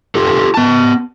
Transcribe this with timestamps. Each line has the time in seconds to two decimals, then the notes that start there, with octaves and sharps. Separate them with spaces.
0.15 F4 G4 A4
0.54 B3 A5